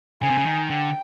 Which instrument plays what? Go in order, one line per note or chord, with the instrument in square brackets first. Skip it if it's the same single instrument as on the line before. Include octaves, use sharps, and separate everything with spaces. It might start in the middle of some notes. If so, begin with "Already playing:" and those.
[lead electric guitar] C#3 [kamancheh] G#5
[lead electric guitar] C3
C#3
D#3
[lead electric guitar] D3 [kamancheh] G5